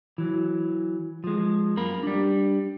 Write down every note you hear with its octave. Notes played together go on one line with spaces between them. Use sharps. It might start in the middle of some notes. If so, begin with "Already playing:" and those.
E3 F#3
F3 G#3
F#2 A#3 A#4 B5
G3 D4